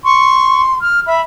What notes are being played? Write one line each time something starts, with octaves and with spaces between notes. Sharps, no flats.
C6 C#6
F6
E5 B5